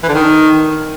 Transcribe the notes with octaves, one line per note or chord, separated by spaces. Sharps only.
E3
D3
D#3